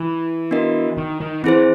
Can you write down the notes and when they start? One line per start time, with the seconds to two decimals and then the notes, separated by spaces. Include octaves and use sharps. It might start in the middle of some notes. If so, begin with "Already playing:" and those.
Already playing: E3
0.51 B3 D4 F#4 A#4 D#5
0.97 D#3
1.20 D#3
1.44 E3 C4 E4 G#4 C5